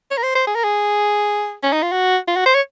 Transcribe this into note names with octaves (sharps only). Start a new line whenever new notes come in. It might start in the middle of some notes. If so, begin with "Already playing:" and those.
C#5
A#4
C5
C5
G#4
A#4
G#4
C#4
D#4
F4
F#4
F4
F#4
C5
C#5